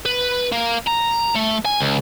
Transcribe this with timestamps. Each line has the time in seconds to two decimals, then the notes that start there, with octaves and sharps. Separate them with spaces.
0.05 B4
0.52 A#3
0.87 A#5
1.36 A3
1.65 G#5
1.80 C#2